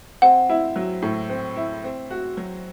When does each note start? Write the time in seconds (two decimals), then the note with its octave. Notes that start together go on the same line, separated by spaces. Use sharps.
0.22 C4 F#5
0.49 E4
0.76 F#3
1.02 A2
1.30 C4
1.56 E4
1.84 C4
2.10 F#4
2.37 F#3